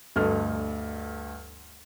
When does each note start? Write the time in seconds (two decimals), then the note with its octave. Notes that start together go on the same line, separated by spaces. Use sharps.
0.16 D2 G2 A4 D#5 F6